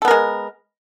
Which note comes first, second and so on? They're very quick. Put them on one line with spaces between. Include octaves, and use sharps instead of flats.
A4 B3 A#4 G#3